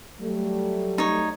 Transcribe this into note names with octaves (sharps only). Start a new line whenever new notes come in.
F#3 G3 A3
D#4 C#5